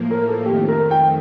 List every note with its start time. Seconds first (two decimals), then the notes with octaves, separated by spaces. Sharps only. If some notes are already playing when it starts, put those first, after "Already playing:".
Already playing: A2 F3 A#3
0.11 A#4
0.28 A4
0.45 F2 D#3 A3 G4
0.68 A#4
0.91 G5